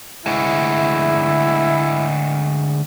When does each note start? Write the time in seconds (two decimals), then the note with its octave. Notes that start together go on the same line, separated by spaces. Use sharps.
0.26 D2 G#3 E4